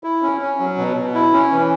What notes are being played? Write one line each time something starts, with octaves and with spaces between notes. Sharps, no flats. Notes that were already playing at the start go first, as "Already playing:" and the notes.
E4
C#4
C#4
F#3
B2
B2
E4
C#4
E3